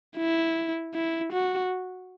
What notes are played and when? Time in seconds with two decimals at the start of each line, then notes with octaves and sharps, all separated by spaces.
0.17 E4
0.94 E4
1.33 F#4